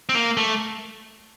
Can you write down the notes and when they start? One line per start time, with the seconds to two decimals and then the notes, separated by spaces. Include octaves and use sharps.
0.09 C4
0.15 A#3
0.37 A3